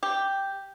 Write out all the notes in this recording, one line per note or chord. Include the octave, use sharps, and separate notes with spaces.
G4